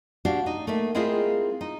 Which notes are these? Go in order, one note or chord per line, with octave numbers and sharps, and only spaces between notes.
D4 F#4 G4 F5
D#4
A3 A#3 E5
G#3 C4 E4 F4 G#4 A#4
D#4